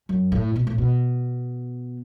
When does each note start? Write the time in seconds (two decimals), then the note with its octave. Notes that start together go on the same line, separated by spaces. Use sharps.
0.09 F#2
0.32 A2
0.56 B2
0.67 A2
0.78 B2